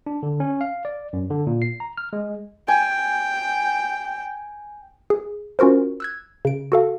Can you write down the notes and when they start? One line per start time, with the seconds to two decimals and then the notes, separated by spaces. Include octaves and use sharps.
0.06 D4
0.23 D3
0.40 C#4
0.61 F5
0.85 D5
1.13 F#2
1.30 D3
1.47 A#2
1.62 C7
1.80 A#5
1.98 F6
2.13 G#3
2.68 G5 G#5
5.10 G#4
5.59 C#4 F4 F#4 A#4 C5
6.00 E6 F#6 G#6
6.45 C#3 D7
6.72 F#4 A4 F5